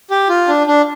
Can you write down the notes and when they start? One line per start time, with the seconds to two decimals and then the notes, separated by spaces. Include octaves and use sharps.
0.11 G4
0.29 F4
0.48 D4
0.67 D4